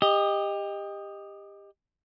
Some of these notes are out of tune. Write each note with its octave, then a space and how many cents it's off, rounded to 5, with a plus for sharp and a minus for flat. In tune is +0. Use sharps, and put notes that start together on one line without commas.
G4 +25 D#5 +0